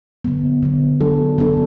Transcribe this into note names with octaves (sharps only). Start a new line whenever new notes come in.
D3 F#3 B3
D3 F#3 B3
F#3 B3 D4 A4
F#3 B3 D4 A4